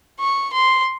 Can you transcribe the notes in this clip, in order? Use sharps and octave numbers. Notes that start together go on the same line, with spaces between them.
C#6
C6